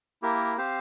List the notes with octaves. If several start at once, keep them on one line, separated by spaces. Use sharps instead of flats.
A#3 E4 G4 A#4
C4 G4 C5 F5